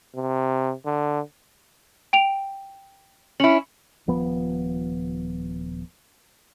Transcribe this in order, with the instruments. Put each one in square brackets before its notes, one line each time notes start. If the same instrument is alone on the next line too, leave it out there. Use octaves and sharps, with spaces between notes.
[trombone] C3
D3
[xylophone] G5 D7 F7
[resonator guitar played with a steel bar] C#4 E4 [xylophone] F#7
[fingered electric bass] D#1 F3 B3